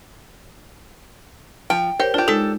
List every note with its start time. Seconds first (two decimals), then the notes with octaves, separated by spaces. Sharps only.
1.70 F3 G5
2.00 G4 A#4 C5 C#5
2.14 D4 F4 G4
2.28 G#3 D#4 A4